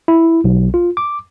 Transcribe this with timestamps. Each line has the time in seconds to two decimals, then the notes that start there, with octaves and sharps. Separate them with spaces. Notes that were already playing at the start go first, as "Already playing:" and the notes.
0.08 E4
0.44 B1
0.74 F4
0.97 D6